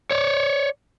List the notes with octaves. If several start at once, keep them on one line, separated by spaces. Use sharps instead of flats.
C#5 D5